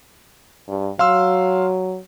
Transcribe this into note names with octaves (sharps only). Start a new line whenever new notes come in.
G2
F#3 F5 C6 E6